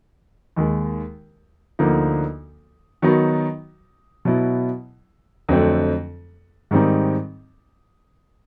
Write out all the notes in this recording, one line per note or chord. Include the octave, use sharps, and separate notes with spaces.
D#2 D#3 G#3
D2 D3 F3 A#3 D#4
D#3 F#3 B3 D#4 F#4
B2 F#3 B3 E4
F2 D3 F#3 A3 C4
G#2 D#3 G3 C4 D#4